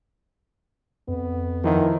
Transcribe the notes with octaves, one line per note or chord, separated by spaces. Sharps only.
F2 B3
D#3 F3 E4 F4